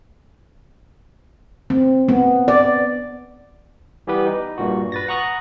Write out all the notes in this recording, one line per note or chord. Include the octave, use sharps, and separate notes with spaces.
C4
B3
D5
E3 G3 B3 G4 B4
D#4
G2 A#2 F#4
B4 A6 A#6
F#5 A#5 C#6 D#6 F#6 A#6